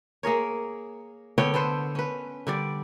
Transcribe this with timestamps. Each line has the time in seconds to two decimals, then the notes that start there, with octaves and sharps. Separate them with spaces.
0.23 A#3 G#4 A#4 C#5
1.38 D3 B3 C#5 G5
1.54 B3 A4 B4 C5
1.95 C#4 B4
2.47 D3 G3 D5